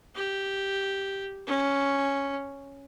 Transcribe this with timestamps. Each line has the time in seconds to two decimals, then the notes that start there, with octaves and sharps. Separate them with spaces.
0.15 G4
1.47 C#4